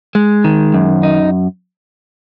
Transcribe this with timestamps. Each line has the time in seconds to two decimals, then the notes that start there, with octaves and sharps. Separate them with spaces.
0.15 G#3
0.44 D#3
0.74 F#2
1.03 D#4